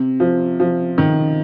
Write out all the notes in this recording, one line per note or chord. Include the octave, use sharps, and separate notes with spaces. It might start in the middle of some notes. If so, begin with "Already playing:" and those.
Already playing: C3
F3
F3
D#3